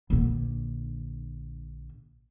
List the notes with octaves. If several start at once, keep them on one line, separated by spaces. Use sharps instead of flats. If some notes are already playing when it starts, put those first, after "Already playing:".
A#1 D3